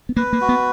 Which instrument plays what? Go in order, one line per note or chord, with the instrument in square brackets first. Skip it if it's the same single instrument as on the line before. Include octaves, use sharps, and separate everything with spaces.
[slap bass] B3
[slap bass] A#3 [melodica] B4
[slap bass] A#3
[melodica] F#4
[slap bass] B3